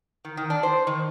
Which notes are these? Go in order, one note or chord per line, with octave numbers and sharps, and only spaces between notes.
D#3
D#3
D4
C5
D#3